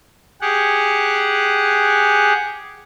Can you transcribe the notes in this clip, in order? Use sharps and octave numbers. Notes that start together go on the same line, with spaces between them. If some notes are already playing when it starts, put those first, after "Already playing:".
G4 G#4 F#5